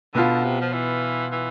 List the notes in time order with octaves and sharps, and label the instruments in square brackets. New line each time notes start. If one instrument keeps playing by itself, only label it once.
[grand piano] B2 B3 F4 [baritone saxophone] D3
[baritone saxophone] C3
F3
E3
E3